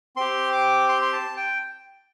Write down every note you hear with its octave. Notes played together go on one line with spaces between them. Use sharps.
C4 G4 C6
D6
C6
C6
A5
G5